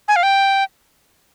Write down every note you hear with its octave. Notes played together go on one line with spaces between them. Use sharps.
G#5
F5
G5